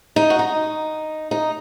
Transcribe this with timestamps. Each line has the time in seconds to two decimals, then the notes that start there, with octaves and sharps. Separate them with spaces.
0.16 D#4
0.30 F#4
0.39 D#4
1.31 D#4